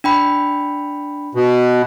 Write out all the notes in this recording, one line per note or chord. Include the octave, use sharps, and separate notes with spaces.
D4 G5 B5
B2